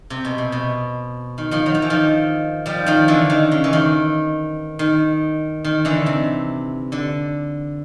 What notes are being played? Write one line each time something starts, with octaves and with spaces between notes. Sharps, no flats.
C3
B2
C3
B2
D#3
D#3 F3
F#3
F3
E3
D#3 F3
F3 G3
D#3 F3
D3 E3
D#3
C#3
E3
D#3
D#3
D#3
D3 E3
C3
D3